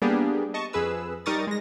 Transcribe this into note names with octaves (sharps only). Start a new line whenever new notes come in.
G3 A#3 B3 D4 G4 G#4
D#5 A5 C#6
F2 G#4 B4 E6
G3 D#4 A#4 C#6 D#6 A6
G#3 A#6